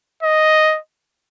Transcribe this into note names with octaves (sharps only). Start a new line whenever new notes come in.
D#5